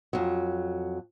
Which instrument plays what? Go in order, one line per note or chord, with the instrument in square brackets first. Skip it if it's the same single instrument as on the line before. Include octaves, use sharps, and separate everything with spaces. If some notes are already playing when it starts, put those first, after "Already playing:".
[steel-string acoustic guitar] F2 F#3